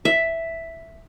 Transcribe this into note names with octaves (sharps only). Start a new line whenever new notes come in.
E5